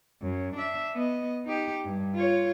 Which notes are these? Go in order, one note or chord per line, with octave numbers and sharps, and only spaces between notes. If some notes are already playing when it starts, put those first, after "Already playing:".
F#2
D4 E5
B3 D#5
D#4 G4
G2
F4 C#5